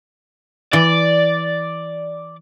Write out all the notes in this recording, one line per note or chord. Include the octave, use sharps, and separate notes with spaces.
E3 D5